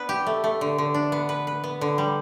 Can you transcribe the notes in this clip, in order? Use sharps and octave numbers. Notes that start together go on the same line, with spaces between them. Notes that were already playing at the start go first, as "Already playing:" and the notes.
Already playing: B3 D4 B4
G4
A3
A3
D3
D3
D4
B3
B4
B4
B3
D3
G3